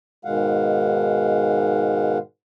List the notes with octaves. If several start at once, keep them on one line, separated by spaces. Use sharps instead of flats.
G#2 B2 D#3 G#3 F5 F#5